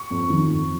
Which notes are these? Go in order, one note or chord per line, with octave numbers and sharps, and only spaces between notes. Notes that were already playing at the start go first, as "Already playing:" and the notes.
Already playing: C#6
F2
D#3
F2